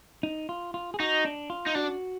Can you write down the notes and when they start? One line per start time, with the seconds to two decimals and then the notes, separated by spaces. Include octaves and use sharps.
0.23 D#4
0.49 F4
0.74 F4
0.94 G#4
1.00 D#4 F#4
1.25 D4
1.50 F4
1.67 D#4
1.75 D4 F#4